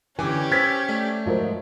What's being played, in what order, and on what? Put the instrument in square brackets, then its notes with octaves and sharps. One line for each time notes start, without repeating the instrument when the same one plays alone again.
[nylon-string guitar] D3 G#5 [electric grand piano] E3 D6 [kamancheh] C#4 G4
[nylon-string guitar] C5 [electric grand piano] D6 E6 F6 [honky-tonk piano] G#6 A6 B6
[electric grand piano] A3 D5
[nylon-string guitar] G#2 F#3 A#4 [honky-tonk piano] F3